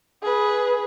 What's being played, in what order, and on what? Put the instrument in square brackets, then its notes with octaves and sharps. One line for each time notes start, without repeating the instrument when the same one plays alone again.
[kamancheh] G#4 B4